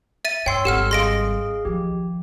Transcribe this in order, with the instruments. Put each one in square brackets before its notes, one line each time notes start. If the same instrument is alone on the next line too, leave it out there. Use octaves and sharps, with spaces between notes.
[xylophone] E5 A6 D#7
[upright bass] G2 [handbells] C#5 C6 E6 [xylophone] G5 C7
[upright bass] G#1 G3 [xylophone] G4 F#5 F6 [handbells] A4
[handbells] G#4 D#5 F5 [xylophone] C6 A#6 D7
[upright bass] D#3 F3 [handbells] G4